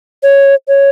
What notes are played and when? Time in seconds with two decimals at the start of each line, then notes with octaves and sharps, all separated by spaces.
0.23 C#5
0.68 C#5